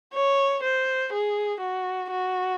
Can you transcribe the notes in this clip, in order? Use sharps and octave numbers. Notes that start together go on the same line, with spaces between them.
C#5
C5
G#4
F#4
F#4